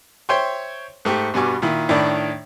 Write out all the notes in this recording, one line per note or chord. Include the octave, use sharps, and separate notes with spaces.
C5 C#5 E5 G5 C6 C#6
G#2 A3 G4
G2 B2 G3 G#5 C#6 D6
A#2 D#3 E4
A2 D#3 D4 D5 B5